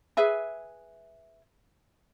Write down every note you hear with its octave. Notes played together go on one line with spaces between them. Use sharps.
G#4 B4 E5 G#5